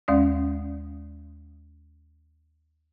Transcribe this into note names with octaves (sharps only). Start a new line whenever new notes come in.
D#2 G#3 C#4 D5 D#6